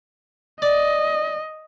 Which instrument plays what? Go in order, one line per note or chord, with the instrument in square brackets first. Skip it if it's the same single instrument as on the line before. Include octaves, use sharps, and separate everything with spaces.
[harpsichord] D5 [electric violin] D#5